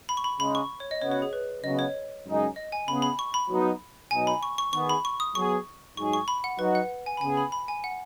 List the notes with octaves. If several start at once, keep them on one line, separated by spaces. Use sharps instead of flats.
B5
C#6
B5
C#3 G#3 D#4 B5
C#6
C#5
D#5
C#3 B3 F#4 C#5
C#5
G#4
B4
C#3 F#3 B3 D#5
C#5
F#2 C#3 G#3 D#4 G#4
D#5
G#5
C#3 B3 G#4 B5
B5
C#6
B5
F#3 B3 D#4
B2 F#3 B3 D#4 G#5
B5
C#6
C#6
D#3 B3 G#4 C#6
B5
C#6
D#6
F#3 B3 G#4 C#6
G#2 F#3 D#4 G#4 C#6
C#6
B5
F#5
F#3 D#4 F#4 B4
F#5
G#5
B5
C#3 B3 G#4 G#5
B5
B5
G#5
F#5